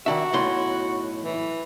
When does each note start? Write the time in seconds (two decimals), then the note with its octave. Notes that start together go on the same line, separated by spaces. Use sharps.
0.06 D#3 D4 F#4 E5
0.33 B1 A2 C6
1.24 E3